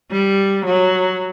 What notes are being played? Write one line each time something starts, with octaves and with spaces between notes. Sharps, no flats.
G3
F#3